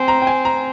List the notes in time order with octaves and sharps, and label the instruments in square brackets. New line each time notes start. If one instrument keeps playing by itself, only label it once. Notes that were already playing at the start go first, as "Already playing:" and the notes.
Already playing: [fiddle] C4 [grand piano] G#5
[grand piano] A#5
G5
G#5
A#5